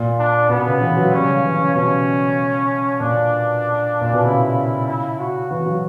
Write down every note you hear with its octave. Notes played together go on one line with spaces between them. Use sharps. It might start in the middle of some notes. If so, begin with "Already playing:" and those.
Already playing: A#2
D4
B2 B3
C#3
E3
F#3
G3 C#4
C#3
E3
C#3
B2 C#4
A#2 D4
A#2
B2
C#3 E4
E4
F#4
E3 F#4
F#3